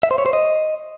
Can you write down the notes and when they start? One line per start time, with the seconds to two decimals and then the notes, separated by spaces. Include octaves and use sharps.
0.03 E5
0.11 C5
0.18 C#5
0.26 C5
0.33 D#5